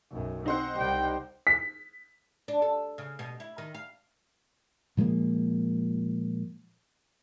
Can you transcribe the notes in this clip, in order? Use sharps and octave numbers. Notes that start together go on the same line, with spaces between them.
B1 F#2
C4 D#4 C5 F#5
C2 G3 G5
B6
D4
A4
C#3
B2
E4
D#3
F5
A#2 F3 G#3 A#3